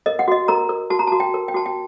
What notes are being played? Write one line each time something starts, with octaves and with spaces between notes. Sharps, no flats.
A#4 D#5
F#5
F#4 D#5
A#4 A#5
A#4
F#4 A5
A#5
F#4 A5
G5
A#4
G5
F#4 A5
G5